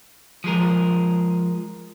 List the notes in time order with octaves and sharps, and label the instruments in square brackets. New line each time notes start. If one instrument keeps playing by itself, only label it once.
[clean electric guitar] F3 G#3 G#4 A#4